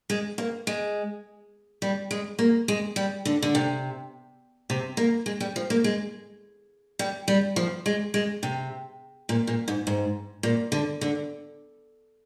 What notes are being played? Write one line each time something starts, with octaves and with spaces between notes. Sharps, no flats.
G#3
A#3
G#3
G3
G#3
A#3
G#3
G3
D3
D3
C3
C3
A#3
G#3
G3
F3
A#3
G#3
G3
G3
F3
G#3
G#3
C3
A#2
A#2
G#2
G#2
A#2
D3
D3